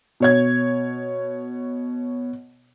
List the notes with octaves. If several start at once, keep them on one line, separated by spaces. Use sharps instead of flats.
B2 C#5 G#6